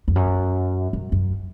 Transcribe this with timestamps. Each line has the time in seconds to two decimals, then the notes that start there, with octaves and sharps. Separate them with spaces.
0.08 F2
0.16 F#2
0.93 F#2
1.12 F#2